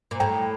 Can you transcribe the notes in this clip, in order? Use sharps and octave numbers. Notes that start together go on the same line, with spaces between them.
A#2
A2 G5 A#5